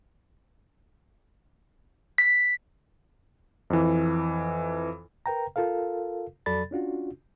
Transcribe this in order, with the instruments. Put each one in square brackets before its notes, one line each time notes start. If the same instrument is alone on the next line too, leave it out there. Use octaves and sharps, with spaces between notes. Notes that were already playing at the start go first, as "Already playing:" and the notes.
[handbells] B6
[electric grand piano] F2 E3
[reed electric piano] A#4 B4 G5 A#5
F4 A4 A#4 F5
F2 F#3 A4 D5 B5 A6
C#4 D4 F4 F#4